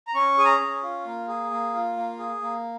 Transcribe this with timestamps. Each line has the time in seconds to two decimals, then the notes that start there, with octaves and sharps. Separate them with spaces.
0.07 A#5
0.14 C#4 C#6
0.38 G#4 G#5
0.45 A#5
0.60 C#4
0.83 F4
1.05 A#3
1.28 G#4
1.50 A#3
1.74 F4
1.97 A#3
2.19 G#4
2.42 A#3